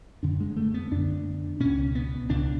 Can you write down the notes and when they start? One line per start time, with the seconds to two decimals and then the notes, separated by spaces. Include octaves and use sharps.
0.23 F#2 D3 D4
0.40 G#3
0.57 A3
0.74 B3
0.92 F#2 D3 D4
1.60 C#2 B2 C#4
1.95 B3
2.29 C#2 B2 D4